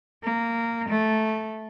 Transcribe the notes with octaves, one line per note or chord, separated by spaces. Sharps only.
A#3
A3